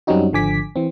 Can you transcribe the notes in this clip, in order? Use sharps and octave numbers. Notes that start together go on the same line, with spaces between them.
F#2 G3 C4 C#4 D#4 F#4
G#1 D3 F3 G#5 D6 B6
E3 C4